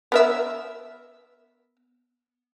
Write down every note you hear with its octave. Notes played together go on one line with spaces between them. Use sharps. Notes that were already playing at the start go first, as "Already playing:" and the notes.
B3 A#4 E5